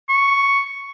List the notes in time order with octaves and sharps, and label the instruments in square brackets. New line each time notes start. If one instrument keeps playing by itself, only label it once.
[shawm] C#6